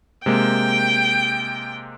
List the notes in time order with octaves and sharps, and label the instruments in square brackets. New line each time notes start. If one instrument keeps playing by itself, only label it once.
[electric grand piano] C3 G#3 A#3 [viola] G5